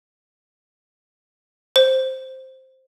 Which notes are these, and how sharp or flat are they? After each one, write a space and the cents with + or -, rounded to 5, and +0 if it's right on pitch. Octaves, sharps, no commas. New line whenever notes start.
C5 +5